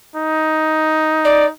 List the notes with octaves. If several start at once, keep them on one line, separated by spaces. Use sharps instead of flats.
D#4
D5